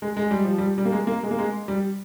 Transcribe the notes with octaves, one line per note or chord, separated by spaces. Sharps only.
G#3
G#3
G3
F3
G3
G3
A#3
G#3
A#3
G#3
A#3
G#3
G3